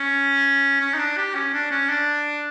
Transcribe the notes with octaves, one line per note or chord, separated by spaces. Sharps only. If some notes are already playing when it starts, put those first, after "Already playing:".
Already playing: C#4
C#4
D#4
D4
G4
C#4
D4
C#4
D4